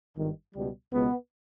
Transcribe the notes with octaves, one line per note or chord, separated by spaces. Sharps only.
G#1 G2 D#3
C#2 B2 G3
C#2 B2 G#3 B3